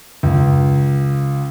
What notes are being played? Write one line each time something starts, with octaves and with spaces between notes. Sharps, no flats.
C#2